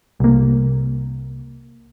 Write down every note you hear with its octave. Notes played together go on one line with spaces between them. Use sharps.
C2 A#3